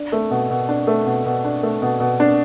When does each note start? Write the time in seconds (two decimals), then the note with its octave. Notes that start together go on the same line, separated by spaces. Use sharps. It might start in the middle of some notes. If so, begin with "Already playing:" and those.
Already playing: D4
0.12 A3
0.31 B2
0.50 B2
0.69 D4
0.87 A3
1.06 B2
1.25 B2
1.44 D4
1.63 A3
1.82 B2
2.00 B2
2.20 D4